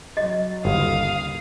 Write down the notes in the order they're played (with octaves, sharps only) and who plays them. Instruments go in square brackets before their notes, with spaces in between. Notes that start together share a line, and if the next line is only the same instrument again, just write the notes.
[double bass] F#3 [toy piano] D#5
[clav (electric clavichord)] G1 [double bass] D#2 C#3 [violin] F5 D#6